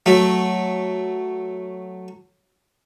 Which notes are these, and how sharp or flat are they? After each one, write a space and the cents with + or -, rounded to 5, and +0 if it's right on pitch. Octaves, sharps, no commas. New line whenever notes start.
F#3 +0 A3 +0